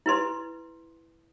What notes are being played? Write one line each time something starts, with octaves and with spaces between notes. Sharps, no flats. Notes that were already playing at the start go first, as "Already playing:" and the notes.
E4 B4 C6